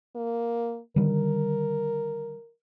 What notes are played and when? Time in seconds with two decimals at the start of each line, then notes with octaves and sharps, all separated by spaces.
0.16 A#3
0.96 D3 D#3 G3 A#4